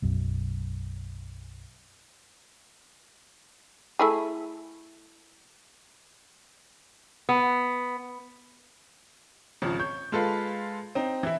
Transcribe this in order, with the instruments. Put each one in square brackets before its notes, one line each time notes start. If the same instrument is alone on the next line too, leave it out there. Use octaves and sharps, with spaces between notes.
[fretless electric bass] B1 F#2
[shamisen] A3 E4 G#4
[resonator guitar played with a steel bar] B3
[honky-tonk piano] G#1 C#3 F3
C#5 G6
G#3 F4 A4 B4 F5
C4 D#4
E3 E4